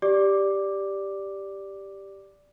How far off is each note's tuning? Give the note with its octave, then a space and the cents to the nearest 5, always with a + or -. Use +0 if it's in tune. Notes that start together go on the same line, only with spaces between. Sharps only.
G4 +0 D5 -5 D6 +0